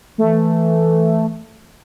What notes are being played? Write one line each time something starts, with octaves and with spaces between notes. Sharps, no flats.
E3 A3